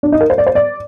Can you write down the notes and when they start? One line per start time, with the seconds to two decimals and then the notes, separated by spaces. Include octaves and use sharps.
0.03 D4
0.12 D#4
0.21 A#4
0.30 C5
0.38 D5
0.47 C5
0.55 D5